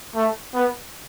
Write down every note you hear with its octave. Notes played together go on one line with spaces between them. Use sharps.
A3
B3